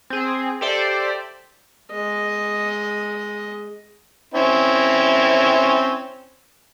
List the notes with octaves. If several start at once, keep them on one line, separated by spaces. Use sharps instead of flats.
C4 G#4
G4 A4 C5 D5 E5
G#3 D#5
C4 C#4 E4